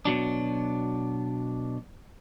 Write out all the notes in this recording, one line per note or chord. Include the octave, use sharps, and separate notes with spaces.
B2 F#3 D4